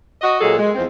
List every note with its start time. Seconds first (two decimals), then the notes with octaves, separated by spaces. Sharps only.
0.21 F#4 D#5
0.41 A#2 F#3 G#3 G#4 A4
0.58 G#3
0.75 E2 F3 C4